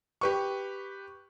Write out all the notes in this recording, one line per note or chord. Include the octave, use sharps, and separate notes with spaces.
G4 B4 C#6